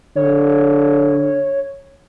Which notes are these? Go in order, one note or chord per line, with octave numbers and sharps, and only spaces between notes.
D3 C#5